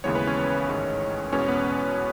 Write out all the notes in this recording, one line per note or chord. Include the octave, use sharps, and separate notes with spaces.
D#2 C#3 E3 G#3 B3 C#5
B4
C#4 C#5
A1 G#2 D#3 G#3
E2 B2 G#3 B3 C#4 C#5
B3 B4